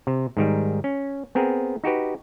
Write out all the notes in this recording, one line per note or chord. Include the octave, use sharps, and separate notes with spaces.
C3
G#2 D#3 G3
C#4
B3 C4 G#4 A#4
D#4 F#4 G4 B4